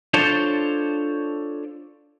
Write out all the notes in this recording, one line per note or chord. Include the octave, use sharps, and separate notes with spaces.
D4 F4 A4 C5 C#5 A5